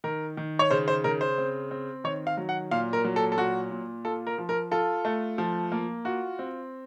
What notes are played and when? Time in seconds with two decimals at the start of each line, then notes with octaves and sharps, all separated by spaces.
0.04 D#3 A#4
0.37 D#3
0.59 C#5
0.71 C#3 C5
0.88 C5
1.04 C#3 A#4
1.21 C5
1.38 C4
1.71 C4
2.04 D#3 C#5
2.27 F5
2.37 F#3
2.49 F#5
2.71 A#2 F5
2.93 A#4
3.04 F#3
3.16 A4
3.32 A4
3.38 A#2 F#4
3.71 A#2
4.05 F4 A4
4.27 A#4
4.38 F3
4.49 A#4
4.71 F4 A4
5.05 A3
5.38 F3
5.72 A#3
6.05 F4 F#4
6.39 C4